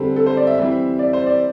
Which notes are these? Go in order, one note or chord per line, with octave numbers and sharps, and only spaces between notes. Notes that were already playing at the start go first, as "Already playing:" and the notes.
Already playing: D3 G3 C4 A4
A4
C5
D5
E5
E3 G3 C4 E5
D5
C5
D5